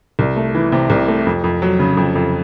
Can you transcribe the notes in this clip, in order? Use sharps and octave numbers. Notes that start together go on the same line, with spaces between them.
C2
A3
E3
C3
C2
A3
F2
F2
F#3
C#3
F2
F2